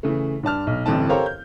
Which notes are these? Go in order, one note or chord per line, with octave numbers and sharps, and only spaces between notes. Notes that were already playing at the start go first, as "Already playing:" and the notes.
C#3 E3 A3
G2 D4 A5 F6
B1
D1 A1 G2 D3 C4 A5
G4 A4 A#4 C5 C#5 F5
G6